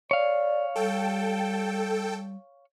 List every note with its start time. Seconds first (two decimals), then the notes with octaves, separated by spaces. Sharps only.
0.11 C#5 D5 F5
0.76 G3 A4 G5